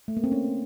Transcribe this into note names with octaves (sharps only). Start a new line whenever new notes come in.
A3
A#3
C4
C#4